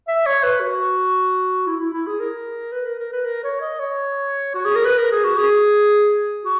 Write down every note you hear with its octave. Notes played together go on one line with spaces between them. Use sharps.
E5
C#5
B4
F#4
E4
E4
E4
G#4
A#4
B4
A#4
A#4
B4
A#4
C#5
D#5
C#5
F#4
G#4
A#4
B4
A#4
G#4
F#4
G#4
F#4